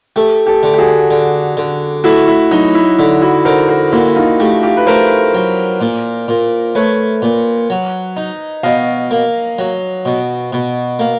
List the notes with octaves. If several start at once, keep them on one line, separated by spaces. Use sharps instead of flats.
A3 G4 A4
G4 A4
D3
G4
F#4 G#4
D3
D3
A3 E4 F#4
E4
F#3 D#4
E4
D3 E4
E4 F#4
D3 A#4 C5
A#4 C5
A#2 E4 F#4
D#4 F4
A3 F4 G4
F4 G4
B4
A3 A#4 C5
F#3
A#2
A#2
A3 B4 C#5
A#2
F#3
D#4
B2 D#5 F5
A#3
F#3
B2
B2
A#3